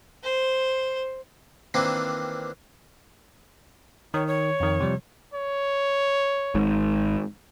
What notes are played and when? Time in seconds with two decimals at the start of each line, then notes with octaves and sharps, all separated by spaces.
0.23 C5
1.74 D#3 E3 A#3 C4 D4
4.14 D#3 C#5
4.27 C#5
4.60 F2 D#3
4.80 C3 F3 G3
5.34 C#5
6.55 G#1 G#2